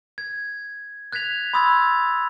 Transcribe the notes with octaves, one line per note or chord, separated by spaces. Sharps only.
G#6
F#6 G#6 A6 B6 F7
B5 C6 D#6 E6 G#6 A6